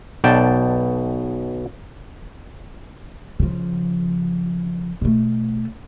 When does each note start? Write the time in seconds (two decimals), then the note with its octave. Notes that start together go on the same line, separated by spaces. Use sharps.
0.24 B1 B2 D5 G5 A5
3.40 C#3 F3
5.02 B2 A3